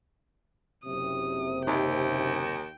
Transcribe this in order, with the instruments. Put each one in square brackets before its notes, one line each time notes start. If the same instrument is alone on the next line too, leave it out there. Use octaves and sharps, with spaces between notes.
[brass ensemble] F#1 C3 [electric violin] D#6
[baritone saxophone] D#2 [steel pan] D#4 [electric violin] G5